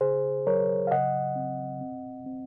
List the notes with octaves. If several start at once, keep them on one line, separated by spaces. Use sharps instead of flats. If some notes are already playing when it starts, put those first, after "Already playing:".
C#3 G#4 C5
F#3 A#4 C#5
F5
C#3 D#5 F#5
C4
C4
C4